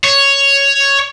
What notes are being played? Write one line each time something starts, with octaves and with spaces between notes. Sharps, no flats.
C#5